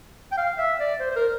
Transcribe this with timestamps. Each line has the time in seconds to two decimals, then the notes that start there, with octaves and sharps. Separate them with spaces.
0.32 G5
0.37 F5
0.58 E5
0.80 D5
1.00 C5
1.11 C5
1.16 A#4